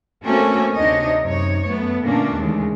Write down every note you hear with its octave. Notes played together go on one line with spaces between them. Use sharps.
A3 A#3 C4 C#4 F#4 A4
D2 C3 D4 D#4 C#5 D#5
F#2 C3 D#4 C#5
F#2 A3 B3
A#2 D3 A3 A#3 C#4 D4
D#2 C#3 E3 G#3 A3